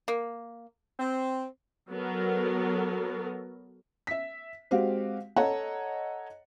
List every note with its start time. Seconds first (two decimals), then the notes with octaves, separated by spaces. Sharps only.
0.08 A#3
0.99 C4
1.90 F#3 B3 A4 A#4
4.07 E5 B6
4.71 G#3 C4 F#4 G4 F5
5.36 A4 C#5 D#5 F#5 A#5